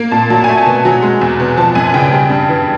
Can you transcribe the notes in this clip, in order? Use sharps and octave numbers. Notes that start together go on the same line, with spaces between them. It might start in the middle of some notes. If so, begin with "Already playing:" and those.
Already playing: A#3
A#2 A5
F#3 A5
A3 G#5
A5
B2
F#3
G#3
E2
B2
F3 A5
F#2 G#5
C#3 G5
G3
G2
E3